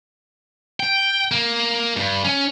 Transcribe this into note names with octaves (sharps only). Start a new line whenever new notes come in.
G5
A#3
G2
C#4